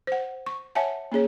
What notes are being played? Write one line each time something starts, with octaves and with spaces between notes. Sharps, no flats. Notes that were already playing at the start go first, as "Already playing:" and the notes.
C5 F#5
C#6
C#5 E5 F#5 G#5 A5
A#3 C#4 G#4 C#5